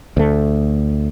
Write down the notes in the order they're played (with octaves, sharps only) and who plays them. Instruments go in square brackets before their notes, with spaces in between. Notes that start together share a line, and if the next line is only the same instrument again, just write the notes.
[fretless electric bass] D2 A3